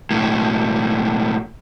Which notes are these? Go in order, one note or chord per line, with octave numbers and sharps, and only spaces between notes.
B1 A2